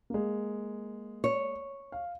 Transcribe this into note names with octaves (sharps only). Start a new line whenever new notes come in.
G#3 A#3
C#5
F5